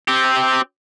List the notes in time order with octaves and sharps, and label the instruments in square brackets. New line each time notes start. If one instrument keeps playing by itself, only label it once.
[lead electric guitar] C4 G4